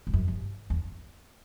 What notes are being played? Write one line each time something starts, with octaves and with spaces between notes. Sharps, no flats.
G2
F#2
G2
E2